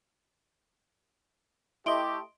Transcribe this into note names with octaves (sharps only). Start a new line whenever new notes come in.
A3 E4 G4 D#5 C6 D7 G7